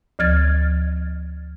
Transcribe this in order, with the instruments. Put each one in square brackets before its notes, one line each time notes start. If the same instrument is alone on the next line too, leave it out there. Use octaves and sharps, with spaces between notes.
[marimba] D2 F3 F6 G#6 A6